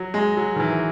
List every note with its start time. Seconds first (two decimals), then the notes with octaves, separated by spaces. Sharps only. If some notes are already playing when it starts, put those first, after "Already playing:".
Already playing: F#3
0.14 G#3
0.37 F#3
0.56 D#3
0.60 E3